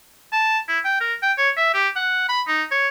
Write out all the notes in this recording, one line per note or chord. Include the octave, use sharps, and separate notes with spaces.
A5
E4
G5
A#4
G5
C#5
E5
G4
F#5
B5
D#4
C#5